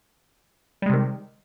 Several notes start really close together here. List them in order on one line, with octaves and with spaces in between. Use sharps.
G3 G#3 C3 D#3